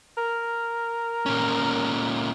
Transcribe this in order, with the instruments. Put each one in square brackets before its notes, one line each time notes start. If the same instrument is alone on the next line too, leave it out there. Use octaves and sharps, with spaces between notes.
[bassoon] A#4
[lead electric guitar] A#2 C#4